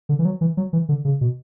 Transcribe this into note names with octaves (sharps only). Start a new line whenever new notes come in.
D3
E3
F#3
E3
F#3
E3
D3
C#3
B2